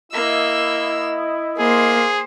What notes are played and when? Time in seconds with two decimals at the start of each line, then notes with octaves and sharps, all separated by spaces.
0.12 A#3 E4 D#5 E6
1.59 A#3 G#4 C5 C6